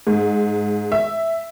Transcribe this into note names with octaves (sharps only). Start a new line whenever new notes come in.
G#2
E5